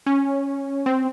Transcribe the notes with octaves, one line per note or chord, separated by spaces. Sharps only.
C#4
C4